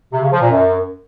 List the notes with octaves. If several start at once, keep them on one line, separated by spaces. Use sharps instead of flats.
C3
C#3
F3
A#2
F#2